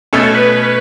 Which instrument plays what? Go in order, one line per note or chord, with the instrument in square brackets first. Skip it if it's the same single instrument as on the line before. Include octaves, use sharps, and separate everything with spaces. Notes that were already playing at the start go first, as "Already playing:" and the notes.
[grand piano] B2 A3 C#4 [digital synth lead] A4
[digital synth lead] B4